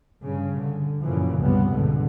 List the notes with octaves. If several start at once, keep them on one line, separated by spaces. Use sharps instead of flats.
G2 C#3
D3
F#2 A#2 C#3 E3 F3
C#2 G2 C3 G3 B3
C#2 G#2 B2 D3